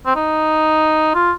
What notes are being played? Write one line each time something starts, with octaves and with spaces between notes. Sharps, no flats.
C4
D#4
F4